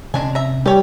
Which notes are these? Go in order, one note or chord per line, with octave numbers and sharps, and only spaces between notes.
C3 G#3 C#4 D4 G#5
E5 A#5
G3 G4 C#5